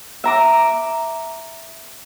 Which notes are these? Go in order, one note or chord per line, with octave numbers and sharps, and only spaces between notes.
E5 A#5 D6